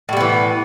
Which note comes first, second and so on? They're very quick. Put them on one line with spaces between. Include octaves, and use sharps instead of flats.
A2 G3 B3 E3